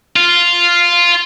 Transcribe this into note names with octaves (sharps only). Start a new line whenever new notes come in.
F4